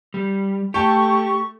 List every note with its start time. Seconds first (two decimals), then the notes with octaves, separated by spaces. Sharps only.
0.14 G3
0.74 A3 G4 G5 A5 C#6